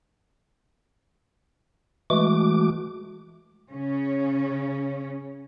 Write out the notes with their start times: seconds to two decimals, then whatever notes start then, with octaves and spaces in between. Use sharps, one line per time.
2.10 E3 G#3 A3 F#4 D6
3.71 C#3 C#4